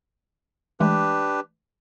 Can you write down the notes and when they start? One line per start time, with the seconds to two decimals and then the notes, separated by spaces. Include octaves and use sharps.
0.80 E3 G#3 A3 D4 G4 B4